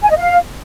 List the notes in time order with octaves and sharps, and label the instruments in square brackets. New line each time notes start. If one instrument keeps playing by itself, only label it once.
[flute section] G#5
D#5
F5